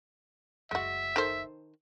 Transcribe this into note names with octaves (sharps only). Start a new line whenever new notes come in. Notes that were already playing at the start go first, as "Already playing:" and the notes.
F#1 D2 G#3 F#4 E5
D#3 A4 C5